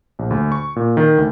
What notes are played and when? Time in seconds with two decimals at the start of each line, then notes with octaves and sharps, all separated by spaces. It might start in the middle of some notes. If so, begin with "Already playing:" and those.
0.19 A#1
0.31 D2
0.52 C#6
0.76 A#2
0.97 D#3
1.18 D2